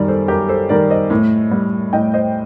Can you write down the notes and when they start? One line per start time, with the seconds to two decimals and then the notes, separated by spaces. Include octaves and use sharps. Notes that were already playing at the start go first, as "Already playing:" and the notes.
Already playing: F#2 D#3 G3 A#4 D5
0.08 A4 C5
0.28 F#2 G4 A#4
0.49 A4 C5
0.69 D#3 G3 A#4 D5
0.90 C5 D#5
1.10 A2
1.51 G3
1.93 A2 D#5 G5
2.14 C5 D#5